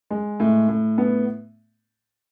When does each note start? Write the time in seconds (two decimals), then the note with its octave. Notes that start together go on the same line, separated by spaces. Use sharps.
0.11 G#3
0.40 A2
0.69 A2
0.98 B3